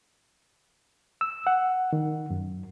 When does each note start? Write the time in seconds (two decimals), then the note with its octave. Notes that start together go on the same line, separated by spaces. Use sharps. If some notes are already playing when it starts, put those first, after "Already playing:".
1.21 E6
1.47 F#5
1.93 D#3
2.30 F#2